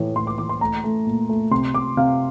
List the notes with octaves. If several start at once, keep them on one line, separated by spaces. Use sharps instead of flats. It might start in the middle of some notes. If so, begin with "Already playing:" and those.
Already playing: A2 E3
A2 C6
D6
E3 D6
C6
A3 A#5
A3
A#2
A3
C3 C6
C3 D6
C3 F5